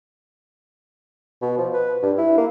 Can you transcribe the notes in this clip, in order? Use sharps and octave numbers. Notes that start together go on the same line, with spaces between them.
B2
F3
B4
G2
E4
A#3